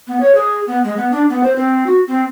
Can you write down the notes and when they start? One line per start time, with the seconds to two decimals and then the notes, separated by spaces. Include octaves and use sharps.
0.07 B3
0.20 C#5
0.35 G#4
0.67 B3
0.84 G#3
0.97 B3
1.12 D4
1.29 B3
1.43 C5
1.56 C4
1.86 F#4
2.07 C4